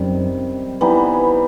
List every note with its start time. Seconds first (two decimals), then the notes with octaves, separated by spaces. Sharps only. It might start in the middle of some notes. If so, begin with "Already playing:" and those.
Already playing: F#2 C3 D#3 G3
0.81 E3 G3 B3 D#4